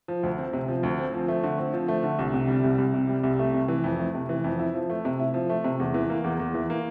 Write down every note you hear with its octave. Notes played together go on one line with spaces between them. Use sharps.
F3
D2
C4
C3
F3
D2
C4
F3
A3
D3
C4
F3
A3
D3
C2
C3
G3
C2
C2
C3
G3
C2
A3
C3
E3
F2
A3
C3
E3
F2
E4
F3
A3
C3
E4
F3
A3
C3
E2
E3
A#3
E2
E2
E3
A#3